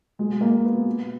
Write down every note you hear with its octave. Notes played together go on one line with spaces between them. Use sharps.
B2 G#3
B2 A#3
B2 B3
B2